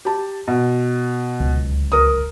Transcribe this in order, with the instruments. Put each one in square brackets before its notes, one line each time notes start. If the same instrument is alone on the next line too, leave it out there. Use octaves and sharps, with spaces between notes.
[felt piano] G4 A5
B2
[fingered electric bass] D1 C#2
[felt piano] A#4 D#6